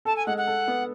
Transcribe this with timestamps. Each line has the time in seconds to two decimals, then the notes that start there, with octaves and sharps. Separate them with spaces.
0.05 A4 A5
0.16 G#5
0.26 G#3 F#5
0.37 F#5
0.47 A4
0.68 B3